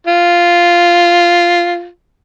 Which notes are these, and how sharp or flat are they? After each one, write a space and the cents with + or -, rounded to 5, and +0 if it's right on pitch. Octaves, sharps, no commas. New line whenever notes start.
F4 -5